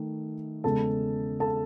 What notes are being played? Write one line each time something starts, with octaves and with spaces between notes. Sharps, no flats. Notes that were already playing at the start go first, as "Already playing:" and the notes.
Already playing: D#3 A3
E2 C#3 G#3 A4 A5
A4 A5